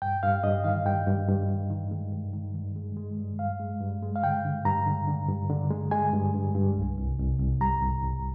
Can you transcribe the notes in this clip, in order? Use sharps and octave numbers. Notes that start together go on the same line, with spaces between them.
G2 G5
G2 F5
G2 D#5
D#3 F5
G2 G5
G2
G2
G2
D#3
G#3
G2
D#3
G2
G#3
G#3
G2
G2 F5
G#3
G2
G#3
F5
D3 G5
D3
G2 A#5
D3
D3
G2
D3
G#3
G#3 G#5
G2
G2
G2
C2
C2
C2
C2
G3 A#5
C2
C2